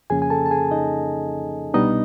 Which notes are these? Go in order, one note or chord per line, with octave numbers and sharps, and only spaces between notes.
F2 C#3 F3 A#3 C#4 G#4 G#5
G#5
A4 A5
A5
G#4 G#5
D#4 D#5
C2 B2 G3 B3 D4 D#4 D#5